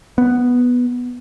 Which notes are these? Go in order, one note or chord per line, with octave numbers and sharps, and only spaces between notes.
B3